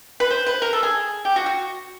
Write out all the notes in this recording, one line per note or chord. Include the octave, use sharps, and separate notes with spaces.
B4
C5
B4
A#4
A4
G#4
G4
F#4
F#4